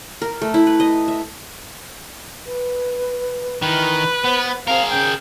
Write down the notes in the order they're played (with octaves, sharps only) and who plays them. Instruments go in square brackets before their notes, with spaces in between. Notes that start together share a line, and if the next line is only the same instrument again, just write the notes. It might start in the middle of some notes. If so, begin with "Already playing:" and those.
[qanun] A#4
A3
E4
B4
D#5
E5
[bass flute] B4
[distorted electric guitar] D#3 [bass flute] E3 [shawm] B4
[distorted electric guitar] B3 [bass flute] C5
[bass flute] C4 [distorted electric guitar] G#4 A#4 [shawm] F5
[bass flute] C#3 [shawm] G5